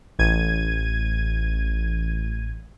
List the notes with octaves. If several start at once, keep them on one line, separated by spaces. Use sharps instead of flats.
A1 G#6 D#7